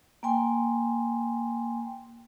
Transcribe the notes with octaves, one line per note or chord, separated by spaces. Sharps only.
A#3 G5 G#5 C6